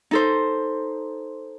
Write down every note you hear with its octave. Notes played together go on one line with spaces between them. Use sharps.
D#4 A4 C5